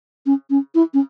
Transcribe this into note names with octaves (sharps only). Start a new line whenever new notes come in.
C#4
C#4
E4
C#4